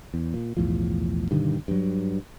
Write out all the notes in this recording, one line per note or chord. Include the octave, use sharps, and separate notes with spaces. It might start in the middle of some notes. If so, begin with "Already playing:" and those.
E2
A#2
B1 E2 A2 F3
G2 B2 D3 D#3
G2 F#3